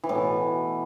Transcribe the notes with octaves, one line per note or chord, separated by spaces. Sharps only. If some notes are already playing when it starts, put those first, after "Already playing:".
E3
A2
B2